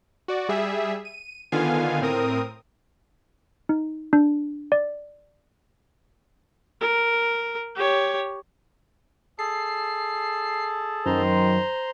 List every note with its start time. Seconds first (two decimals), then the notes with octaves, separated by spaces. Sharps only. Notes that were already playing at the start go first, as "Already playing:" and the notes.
0.28 F#4 D5
0.49 G3 G#4 E5
1.05 D#7
1.52 D3 D#3 B3 F4 F5 G#5
2.01 A2 C4 A#4 D#6
3.69 D#4
4.13 D4
4.72 D5
6.81 A#4
7.76 G4 C#5
9.39 G#4 A4 A5 C7
11.06 F#2 D#3 C5 A#5 C6